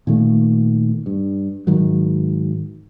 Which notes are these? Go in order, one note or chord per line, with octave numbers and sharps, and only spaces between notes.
A#2 D#3 A3
G2
G#2 D#3 F#3